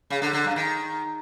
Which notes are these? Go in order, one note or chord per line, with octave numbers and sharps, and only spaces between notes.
C#3
D3
D3
G2
D#3